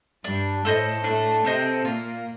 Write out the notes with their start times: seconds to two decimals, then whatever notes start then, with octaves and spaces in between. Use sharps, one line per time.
0.24 G2 G3 D4
0.64 A2 A3 A4 C5 D#5
1.04 A2 A3 D4
1.44 C3 C4 A4 C5 D#5
1.85 A#2 A#3 F4